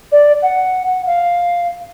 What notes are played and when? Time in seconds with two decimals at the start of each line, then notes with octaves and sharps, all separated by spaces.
0.12 D5
0.42 F#5
0.86 F#5
1.07 F5